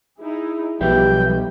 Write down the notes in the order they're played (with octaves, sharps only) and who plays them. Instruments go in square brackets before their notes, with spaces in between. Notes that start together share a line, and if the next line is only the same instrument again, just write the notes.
[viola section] D#4 E4 G#4
[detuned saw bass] B1 [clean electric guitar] F3 B4 E5 [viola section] G3 [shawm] G5